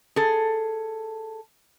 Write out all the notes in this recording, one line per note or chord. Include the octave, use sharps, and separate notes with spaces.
G#4 A4